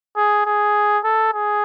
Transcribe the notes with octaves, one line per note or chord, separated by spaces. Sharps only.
G#4
G#4
A4
G#4